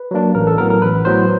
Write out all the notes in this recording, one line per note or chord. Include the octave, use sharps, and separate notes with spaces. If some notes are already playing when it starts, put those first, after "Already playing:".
Already playing: B4
F#3 A#3 D4
A1 A#4
A4
A2 F#3 B3 A#4
A#4
A1 B4
A2 F#3 B3 C5